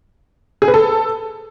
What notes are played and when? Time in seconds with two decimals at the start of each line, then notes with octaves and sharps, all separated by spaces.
0.62 G#4
0.68 B4
0.74 A4